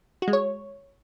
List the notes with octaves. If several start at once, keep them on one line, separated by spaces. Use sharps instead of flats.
F#4
G#3
C#5